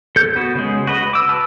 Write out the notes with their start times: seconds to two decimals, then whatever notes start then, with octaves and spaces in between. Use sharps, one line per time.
0.16 A4 G6
0.36 B3 F#4
0.55 C#3 G#3
0.87 F#4 B4 D#5
1.13 D6 E6
1.29 B4 A5 F6